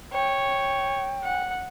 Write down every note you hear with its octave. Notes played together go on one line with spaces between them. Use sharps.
C#5 G5
F#5